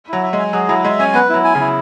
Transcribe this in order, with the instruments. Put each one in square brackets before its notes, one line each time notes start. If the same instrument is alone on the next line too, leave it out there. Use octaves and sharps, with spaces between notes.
[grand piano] F#3 [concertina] E4
[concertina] E5
[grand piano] G#3
[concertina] G#5
[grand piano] F#3 [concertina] G#4
[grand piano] F#3 [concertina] E4
[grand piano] G#3 [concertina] E5
[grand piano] C#4 [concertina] G#5
[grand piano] B3 [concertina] B4
[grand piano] F#3 [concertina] E4
[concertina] G#5
[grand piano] C#3
[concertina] E4